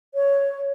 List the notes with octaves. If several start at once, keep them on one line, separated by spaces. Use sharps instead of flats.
C#5